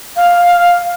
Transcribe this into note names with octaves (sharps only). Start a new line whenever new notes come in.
F5